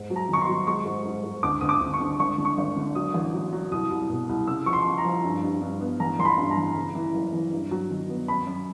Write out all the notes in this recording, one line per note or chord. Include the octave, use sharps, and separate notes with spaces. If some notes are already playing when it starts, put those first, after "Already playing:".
Already playing: G#2
F#3
A#5
D#3 C#6
C6
F#3
G#3 C#6
G#2
G#2
G#2
D2 D6
D2 D#6
D6
D2
C#6
D3
G#1 C#6
D3
C#6
G#1
D3
F#3 D#6
A1
F#3
F#3
C2 D#6
C2
B2
C2
C#3 E6
F3 C#6
C6
C#3
A#5
F3
G2
G2
G2
B3
A1 A#5
A1 C6
B5
G2
A#5
A1
C#3
E3
F#1
E3
G2
F#3
D#3
B3
F#2 B5
F#2